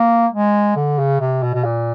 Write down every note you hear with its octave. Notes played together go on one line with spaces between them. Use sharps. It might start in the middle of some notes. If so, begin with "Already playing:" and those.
Already playing: A#3
G#3
D3
C#3
C3
B2
B2
A#2